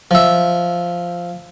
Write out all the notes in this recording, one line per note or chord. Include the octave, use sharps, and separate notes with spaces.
F3 E5